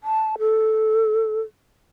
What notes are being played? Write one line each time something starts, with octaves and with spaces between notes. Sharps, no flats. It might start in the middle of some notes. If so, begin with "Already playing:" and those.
A5
A4